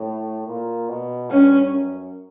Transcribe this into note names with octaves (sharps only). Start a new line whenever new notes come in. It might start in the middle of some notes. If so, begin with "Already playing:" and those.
Already playing: A2
A#2
B2
G2 C#4
F#2